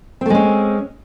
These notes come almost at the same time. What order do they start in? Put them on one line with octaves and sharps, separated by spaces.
C4 A3 G#3 C#4